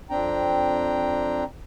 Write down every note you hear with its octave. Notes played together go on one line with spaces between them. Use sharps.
F2 C4 D4 G5 A#5